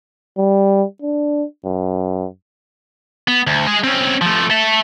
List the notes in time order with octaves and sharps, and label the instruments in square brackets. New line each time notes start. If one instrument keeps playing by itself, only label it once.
[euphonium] G3
D4
F#2
[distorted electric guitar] B3
D2
G#3 G#4
C4 C#4
F3 A3
A4 E5